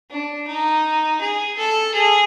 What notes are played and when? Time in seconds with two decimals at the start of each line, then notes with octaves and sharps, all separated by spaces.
0.10 D4
0.47 D#4
1.21 G#4
1.57 A4
1.94 G#4